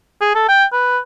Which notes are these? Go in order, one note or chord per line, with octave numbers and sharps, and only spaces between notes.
G#4
A4
G5
B4